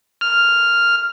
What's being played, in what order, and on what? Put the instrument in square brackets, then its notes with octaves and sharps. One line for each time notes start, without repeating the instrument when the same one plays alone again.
[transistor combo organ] F6